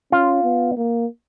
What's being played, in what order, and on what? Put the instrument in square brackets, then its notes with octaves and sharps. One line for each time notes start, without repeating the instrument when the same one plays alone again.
[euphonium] C#4 [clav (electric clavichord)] F4
[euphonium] B3
A#3